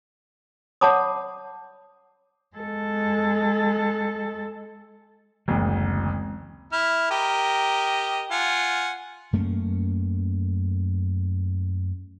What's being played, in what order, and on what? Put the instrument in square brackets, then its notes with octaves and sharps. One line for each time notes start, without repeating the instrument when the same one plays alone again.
[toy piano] C#5 F#5 A5 B5 D6 D#6
[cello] G#3 A4
[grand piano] F#1 D2 [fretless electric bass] E3 G#3 C4
[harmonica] E4 F6
G4 A#4 D#5
F4 F#5 G#5
[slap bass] F#2 A3 A#3 C#4